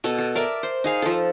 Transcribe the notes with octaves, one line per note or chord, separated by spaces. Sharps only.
B2 A4
A4
A#4 D5 E5
C5
D#4 G#4 F5
F3 A4